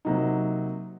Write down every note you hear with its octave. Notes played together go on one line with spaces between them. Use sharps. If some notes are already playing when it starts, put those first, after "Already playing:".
C3 F#3 A#3 D#4